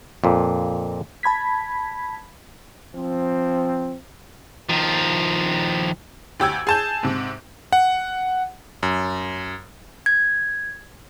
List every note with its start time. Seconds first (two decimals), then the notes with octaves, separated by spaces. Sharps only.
0.24 F2 A#2
1.23 A5 B5 G#6 B6
2.96 F3 C4
4.69 D#3 F3
6.40 D2 G4 E6 G#6
6.67 G#4 A5 G6
7.03 G#2 C3
7.73 F#5
8.83 F#2
10.06 G#6